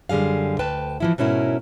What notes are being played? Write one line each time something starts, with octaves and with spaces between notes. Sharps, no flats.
F#2 D3 G3 G#4 F5
D2 B4 G5 A5
E3 F3 E4
G#2 B2 C#4 E4 A#4